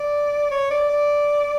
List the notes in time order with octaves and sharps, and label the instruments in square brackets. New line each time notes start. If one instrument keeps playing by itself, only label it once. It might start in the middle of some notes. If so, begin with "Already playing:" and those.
Already playing: [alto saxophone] D5
C#5
D5
D5